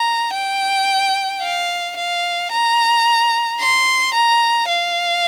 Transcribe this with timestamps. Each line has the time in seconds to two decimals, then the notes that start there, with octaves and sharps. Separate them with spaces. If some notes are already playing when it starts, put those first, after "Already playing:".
Already playing: A#5
0.34 G5
1.42 F5
1.97 F5
2.52 A#5
3.60 C6
4.14 A#5
4.68 F5